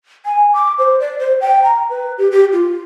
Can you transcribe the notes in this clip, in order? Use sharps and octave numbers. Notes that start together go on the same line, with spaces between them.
G#5
D6
C5
D5
C5
G5
A#5
B4
G4
G4
F4